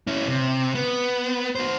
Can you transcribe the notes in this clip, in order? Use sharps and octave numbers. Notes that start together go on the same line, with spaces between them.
C#4 E4
C3
B3
F#4 C5